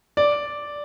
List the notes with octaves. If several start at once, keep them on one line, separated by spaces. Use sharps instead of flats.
D5